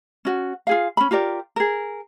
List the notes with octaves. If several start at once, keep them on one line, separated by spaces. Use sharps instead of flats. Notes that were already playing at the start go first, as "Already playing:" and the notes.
C#4 F#4
F4 G#4 F5
C#4 B5
F4 G4 A#4 D5
G#4 A#4